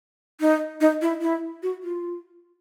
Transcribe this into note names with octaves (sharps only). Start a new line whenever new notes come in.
D#4
D#4
E4
E4
F#4
F4